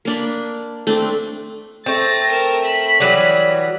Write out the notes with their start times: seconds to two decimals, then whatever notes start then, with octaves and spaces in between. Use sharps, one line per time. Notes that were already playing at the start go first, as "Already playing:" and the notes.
0.05 A#3 D4 B5
0.87 A3 C4 D4
1.86 A3 C4 A6 A#6
2.30 A#4 E7
2.65 B5
3.00 E3 F#3 G3